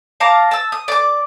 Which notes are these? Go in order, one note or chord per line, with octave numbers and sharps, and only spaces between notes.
F5 A5 A#5 D6
A5 E6
D#6
D5 D6